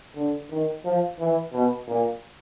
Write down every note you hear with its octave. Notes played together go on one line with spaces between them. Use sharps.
D3
D#3
F3
E3
B2
A#2